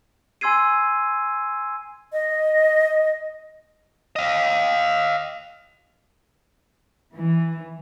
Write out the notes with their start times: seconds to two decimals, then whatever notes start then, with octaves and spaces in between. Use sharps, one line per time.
0.41 G#5 C6 E6 G#6 C7 D#7
2.13 D#5
4.16 D#5 F5
7.14 E3